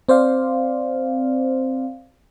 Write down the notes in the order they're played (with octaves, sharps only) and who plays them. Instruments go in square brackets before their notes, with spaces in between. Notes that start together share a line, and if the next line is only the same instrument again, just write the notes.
[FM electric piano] C4 C5 D5 F5